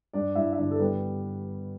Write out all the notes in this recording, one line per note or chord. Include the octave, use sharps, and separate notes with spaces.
G2 D4 D5
G2 E4 E5
E5
G1 D4 D5
A4
G3 B3 B4